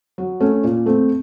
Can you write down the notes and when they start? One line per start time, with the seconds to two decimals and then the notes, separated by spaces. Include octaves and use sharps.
0.18 F#3
0.40 A3 C#4
0.64 A#2
0.86 A3 C4